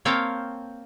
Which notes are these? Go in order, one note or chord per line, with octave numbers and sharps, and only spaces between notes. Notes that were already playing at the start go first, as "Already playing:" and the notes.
A#3 C4 C#5 F5 G5 A5